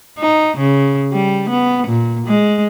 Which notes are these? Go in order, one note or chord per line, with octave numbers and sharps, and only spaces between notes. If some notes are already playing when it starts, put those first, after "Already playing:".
D#4
C#3
G3
B3
A#2
G#3